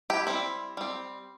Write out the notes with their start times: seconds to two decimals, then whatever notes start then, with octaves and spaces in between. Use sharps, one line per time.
0.10 E4 G4
0.27 G3 C4 E4
0.77 G3 C4